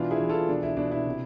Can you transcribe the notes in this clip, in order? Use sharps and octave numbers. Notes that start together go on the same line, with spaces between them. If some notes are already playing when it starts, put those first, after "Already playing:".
Already playing: B2 E3 D4 F4
E4 G#4
E3
F4 A4
B2 D4
E4
B2 D4
E4
C3